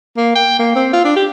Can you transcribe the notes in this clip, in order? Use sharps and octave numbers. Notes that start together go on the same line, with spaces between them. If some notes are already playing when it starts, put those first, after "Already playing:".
A#3
G5
A#3
C4
F4
D4
G4